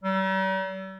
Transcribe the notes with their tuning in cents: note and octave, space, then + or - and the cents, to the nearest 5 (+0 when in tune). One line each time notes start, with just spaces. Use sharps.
G3 -45